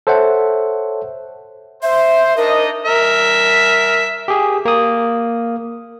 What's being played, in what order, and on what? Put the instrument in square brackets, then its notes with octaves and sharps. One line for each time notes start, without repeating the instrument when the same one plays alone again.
[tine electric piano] A4 C5 C#5 E5 F#5
[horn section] C5 [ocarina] E5
[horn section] D4 D#4 D#5 [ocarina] A#4
[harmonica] A#4 E5
[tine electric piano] G4 G#4
A#3 D#6